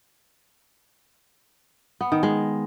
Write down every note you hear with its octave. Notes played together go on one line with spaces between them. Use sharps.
B3
D#3
G#3